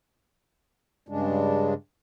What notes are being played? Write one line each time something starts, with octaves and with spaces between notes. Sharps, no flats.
G2 C#3 G#3 D4